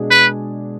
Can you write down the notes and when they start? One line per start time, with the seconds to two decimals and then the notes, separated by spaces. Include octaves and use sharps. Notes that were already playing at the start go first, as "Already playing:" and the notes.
Already playing: B2 G#3 D4 G#4
0.11 B4